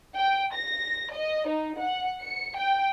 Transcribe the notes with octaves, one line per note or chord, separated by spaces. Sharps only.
G5
A#6
D#5
D#4
F#5
C#7
G5